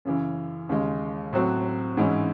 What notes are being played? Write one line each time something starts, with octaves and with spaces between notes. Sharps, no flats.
F#2 C#3 E3
D#2 C#3 G#3
A2 F#3 C4 F#4
G#2 E3 G#3 C#4 E4